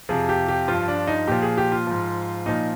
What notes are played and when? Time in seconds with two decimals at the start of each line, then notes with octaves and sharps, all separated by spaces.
0.09 F2 C3 F3 G#4
0.29 G4
0.48 G4
0.68 G2 F3 F4
0.88 D4
1.07 D#4
1.27 A#2 F3 G4
1.42 G#4
1.57 G4
1.72 F4
1.87 G#2 F3
2.46 A#2 F3 D#4